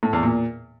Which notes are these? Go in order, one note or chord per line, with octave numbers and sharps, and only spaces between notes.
A2
E2
A#2